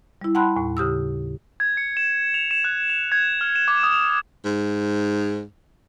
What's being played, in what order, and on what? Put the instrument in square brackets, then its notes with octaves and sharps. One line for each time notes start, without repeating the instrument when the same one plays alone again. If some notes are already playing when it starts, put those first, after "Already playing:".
[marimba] G3 E4
F#5 G5 A5 B5 C6 F#6
D#2 A2
C#3 G4 D#6 E6
[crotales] G#6
C#7
E7
F7
E7
F#6
F7
G#6
F6
E7
D6
D#6
[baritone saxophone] G#2